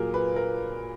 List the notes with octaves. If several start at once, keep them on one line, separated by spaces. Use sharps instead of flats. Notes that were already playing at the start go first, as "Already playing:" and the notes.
Already playing: A#2 F#3 G#4 A#4
B4
A#4